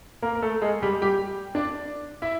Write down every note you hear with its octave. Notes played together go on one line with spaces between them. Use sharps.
A#3 A#4
A#4
A3 A4
G#3 G#4
G3 G4
G3 G4
D4 D5
E4 E5